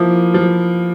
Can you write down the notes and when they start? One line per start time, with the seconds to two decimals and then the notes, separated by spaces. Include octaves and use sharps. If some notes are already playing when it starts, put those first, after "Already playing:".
Already playing: F3 A#3 E4
0.34 F3